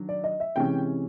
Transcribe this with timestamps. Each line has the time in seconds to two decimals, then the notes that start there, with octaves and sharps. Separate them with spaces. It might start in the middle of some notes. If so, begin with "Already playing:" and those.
Already playing: D#3 F#3 D4
0.09 D5
0.24 D#5
0.40 E5
0.56 C3 E3 G#3 C#4 G5